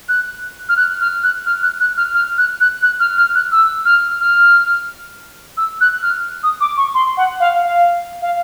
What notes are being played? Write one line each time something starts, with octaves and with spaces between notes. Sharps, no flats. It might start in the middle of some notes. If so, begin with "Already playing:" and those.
F#6
F6
F#6
F6
F#6
F6
F#6
F#6
F6
F6
F#6
F#6
F#6
F6
F6
F#6
E6
F6
F6
E6
F#6
F6
D#6
D6
C#6
C6
F#5
F5
F5
F5